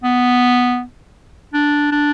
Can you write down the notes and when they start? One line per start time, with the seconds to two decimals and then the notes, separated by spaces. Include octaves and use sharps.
0.04 B3
1.54 D4
1.92 D4